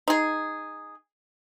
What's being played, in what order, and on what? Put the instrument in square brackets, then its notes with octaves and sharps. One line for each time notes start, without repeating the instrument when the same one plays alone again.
[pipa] D#4 G#4